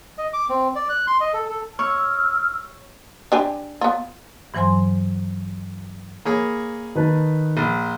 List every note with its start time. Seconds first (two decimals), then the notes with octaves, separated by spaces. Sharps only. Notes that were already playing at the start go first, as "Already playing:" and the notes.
0.18 D#5
0.33 D6
0.49 C4
0.76 D5
0.89 F#6
1.07 C6
1.20 D#5
1.34 A4
1.49 A4
1.79 C#5 C#6 E6 F6
3.32 D4 G4 G#5
3.81 B3 F4
4.54 G2 E3 F#3 C5 G#5 C6
6.25 A#3 G#4 C#5 B5
6.95 D#3 B4 A5
7.57 A#1 D#7